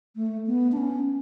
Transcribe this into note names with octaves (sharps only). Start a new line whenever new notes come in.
A3
B3
D4
C#4